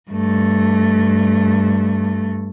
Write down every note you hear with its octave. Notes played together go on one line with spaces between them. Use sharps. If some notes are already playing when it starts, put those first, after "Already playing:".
G2 A3